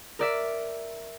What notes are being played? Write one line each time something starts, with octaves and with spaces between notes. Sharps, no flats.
A#4 D5 E5